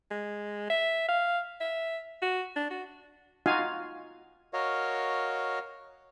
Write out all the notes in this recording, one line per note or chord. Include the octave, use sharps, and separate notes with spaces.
G#3
E5
F5
E5
F#4
D4
F#4
D#4 F4 F#4 F5 G#5
F#4 A#4 C#5 D#5 F5